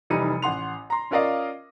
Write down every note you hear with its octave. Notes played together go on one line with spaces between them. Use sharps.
F1 E3 G3 D#4 C#7 D#7
A1 F#5 C6 F7
A#5 C6
C#4 F4 A#4 D5 D#5 F5